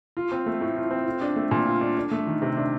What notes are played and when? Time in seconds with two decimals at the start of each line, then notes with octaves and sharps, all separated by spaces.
0.17 F4
0.32 C4
0.46 A3
0.61 A2
0.76 F4
0.91 C4
1.06 F4
1.21 D4
1.36 A3
1.51 A#2
1.67 F4
1.81 D4
1.97 D4
2.11 A3
2.27 D#3
2.42 C3
2.57 D4